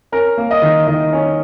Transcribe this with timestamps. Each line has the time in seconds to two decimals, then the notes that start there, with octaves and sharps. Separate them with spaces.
0.12 C#4 A#4
0.38 A#3
0.51 D#5
0.62 D#3
0.87 D#3 D#5
1.13 C#4